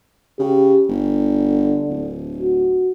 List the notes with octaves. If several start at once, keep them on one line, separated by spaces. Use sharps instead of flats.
C#3 G4
G1 D3
D1
F#4